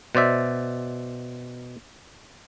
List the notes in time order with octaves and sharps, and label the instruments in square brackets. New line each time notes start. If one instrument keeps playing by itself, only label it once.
[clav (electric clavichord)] B2 C5 D5 E5